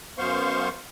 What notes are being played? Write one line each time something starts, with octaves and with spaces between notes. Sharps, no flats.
F#2 B3 C5 F5 C6 C#6